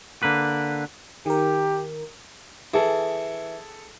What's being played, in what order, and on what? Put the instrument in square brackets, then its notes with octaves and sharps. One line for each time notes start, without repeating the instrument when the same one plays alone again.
[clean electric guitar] D3 A#3 B4
[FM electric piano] D#3 A#4 [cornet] G4
[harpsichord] E3 [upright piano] G#4 A4